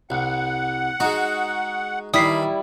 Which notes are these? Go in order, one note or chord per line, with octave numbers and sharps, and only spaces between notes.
C2 F#5
G#3 D#4 F#4
D#3 E3 G3 E4 D#6 B6 C7